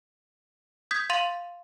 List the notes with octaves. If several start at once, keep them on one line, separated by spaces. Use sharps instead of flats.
D#6 G6 G#6 B6
F5 C6 A6 D#7 F7 F#7